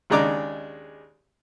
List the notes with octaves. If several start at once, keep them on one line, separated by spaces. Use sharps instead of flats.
D#2 C#3 G#3 D4 A#5 D6